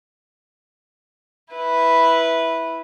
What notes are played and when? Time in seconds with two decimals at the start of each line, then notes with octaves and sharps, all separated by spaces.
1.53 E4 B4